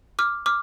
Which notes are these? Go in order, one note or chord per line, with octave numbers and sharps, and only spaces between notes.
D6 F6
D6 F6